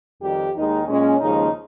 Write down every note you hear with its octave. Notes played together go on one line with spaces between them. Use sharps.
F2 D#3 G3 G4
D#2 D#3 G#3 D#4
A#2 G#3 C#4
D#2 C#3 F3 G#3 D#4